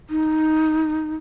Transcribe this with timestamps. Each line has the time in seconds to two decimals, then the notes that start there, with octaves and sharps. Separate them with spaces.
0.10 D#4